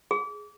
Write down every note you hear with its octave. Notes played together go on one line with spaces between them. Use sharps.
G#4